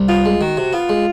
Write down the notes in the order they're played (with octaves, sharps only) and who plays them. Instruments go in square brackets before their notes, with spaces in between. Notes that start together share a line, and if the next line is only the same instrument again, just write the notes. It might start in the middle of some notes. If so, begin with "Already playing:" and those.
Already playing: [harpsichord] C2
[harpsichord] B3 [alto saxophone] F4
[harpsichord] G#3
[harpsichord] D#3 [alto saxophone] F#4
[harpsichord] C3
[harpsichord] B3 [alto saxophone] F4
[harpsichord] G#3